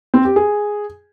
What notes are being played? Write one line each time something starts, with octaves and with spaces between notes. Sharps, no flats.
C4
G4
G#4